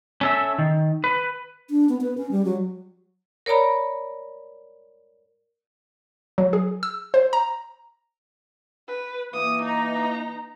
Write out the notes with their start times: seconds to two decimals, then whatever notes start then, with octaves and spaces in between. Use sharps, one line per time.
0.21 C#4 A4 E5
0.58 D#3
1.04 B4
1.70 D4
1.89 B3
2.01 B4
2.18 C#4
2.31 G3
2.45 F#3
3.46 A#4 C#5 D5 A#5 B5
6.38 F#3
6.53 G#4
6.83 E6
7.14 C5
7.33 A#5
8.88 B4
9.33 E3 A#3 D#6
9.62 D#4 A#5